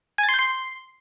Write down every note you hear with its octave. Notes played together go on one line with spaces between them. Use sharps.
G#5
A6
C6
G6
C6